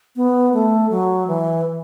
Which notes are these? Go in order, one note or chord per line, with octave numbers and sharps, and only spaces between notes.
B3
A3
F#3
E3